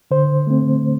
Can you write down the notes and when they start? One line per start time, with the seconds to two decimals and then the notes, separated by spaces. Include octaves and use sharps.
0.11 D3 C5
0.47 A3 C4